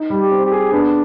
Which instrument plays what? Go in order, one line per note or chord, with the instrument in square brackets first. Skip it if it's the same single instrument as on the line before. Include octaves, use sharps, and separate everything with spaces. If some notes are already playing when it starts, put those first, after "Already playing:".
Already playing: [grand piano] D#4
G3
[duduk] G4
[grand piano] C4
[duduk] G4
[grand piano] G#4
[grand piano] B3 [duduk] D4